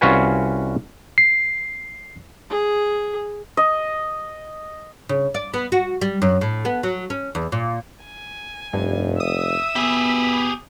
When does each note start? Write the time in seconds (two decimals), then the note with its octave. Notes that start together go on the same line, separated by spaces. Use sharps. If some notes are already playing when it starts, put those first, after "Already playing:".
0.01 C2 C#4 F4 F#4 B4 G#5
1.18 C7
2.50 G#4
3.57 D#5
5.09 C#3
5.34 D5
5.54 B3
5.72 F#4
6.01 G3
6.22 F#2
6.41 A2
6.65 B3
6.83 F#3
7.10 C#4
7.35 E2
7.52 A#2
8.05 G#5
8.73 F1 G2
9.20 E5 D#6 E6
9.76 B3 G4 G#4 B5